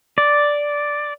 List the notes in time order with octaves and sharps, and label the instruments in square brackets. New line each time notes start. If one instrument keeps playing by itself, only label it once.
[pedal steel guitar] D5